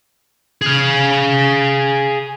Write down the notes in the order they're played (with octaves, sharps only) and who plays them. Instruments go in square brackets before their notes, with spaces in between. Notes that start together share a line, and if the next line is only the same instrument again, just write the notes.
[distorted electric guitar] G#4 F5